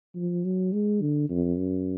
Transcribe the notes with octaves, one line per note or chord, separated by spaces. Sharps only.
F3
F#3
G#3
D3
F2
F#2